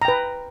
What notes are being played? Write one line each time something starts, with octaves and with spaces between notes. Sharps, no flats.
B4 G5 A#5